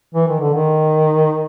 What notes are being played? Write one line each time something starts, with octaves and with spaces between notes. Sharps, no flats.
E3
D#3
D3
D#3